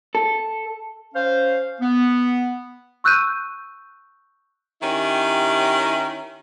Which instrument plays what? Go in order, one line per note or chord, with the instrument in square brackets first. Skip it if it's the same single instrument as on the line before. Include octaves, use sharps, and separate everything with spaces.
[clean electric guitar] A4
[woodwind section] C#4 C5 F5
B3
[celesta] C#6 E6 F#6 G6 D#7
[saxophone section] D#3 C#4 E4 G4